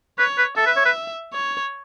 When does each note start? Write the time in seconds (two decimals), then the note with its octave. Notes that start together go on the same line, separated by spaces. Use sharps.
0.19 B4 C#5
0.38 B4
0.57 A4 E5
0.66 B4
0.76 C#5
0.85 B4
1.33 C#5